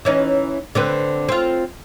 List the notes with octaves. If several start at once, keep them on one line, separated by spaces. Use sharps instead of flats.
E3 C#4 D#4
D3 C4 B4
C4 F4